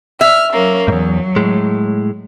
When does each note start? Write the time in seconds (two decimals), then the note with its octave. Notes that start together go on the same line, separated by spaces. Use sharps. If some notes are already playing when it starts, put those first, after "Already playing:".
0.21 E5 F6
0.53 F#3 A#3 C#4
0.88 E2 G#2 F#3
1.36 A2 G#3